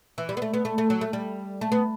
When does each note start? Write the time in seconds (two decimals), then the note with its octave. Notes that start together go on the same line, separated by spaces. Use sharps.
0.18 E3
0.29 G3
0.37 B3
0.42 A3
0.54 B3
0.65 A3
0.78 A3
0.90 F#3
1.01 A3
1.13 G3
1.61 A3
1.72 B3